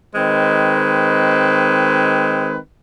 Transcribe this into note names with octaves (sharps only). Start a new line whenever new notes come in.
D#3 G#3 C4 B4